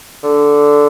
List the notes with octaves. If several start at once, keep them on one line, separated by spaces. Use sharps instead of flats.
D3